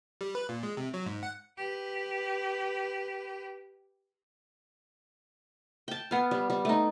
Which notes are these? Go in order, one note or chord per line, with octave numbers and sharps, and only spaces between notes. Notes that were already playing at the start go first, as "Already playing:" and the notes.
G3
B4
A#2
G#3
C3
F#3
G#2
F#5
G4 B4
G5 A5
B3 F5
G3
G3
A3 D#4